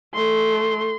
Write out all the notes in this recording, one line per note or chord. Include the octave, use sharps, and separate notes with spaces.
A3 C6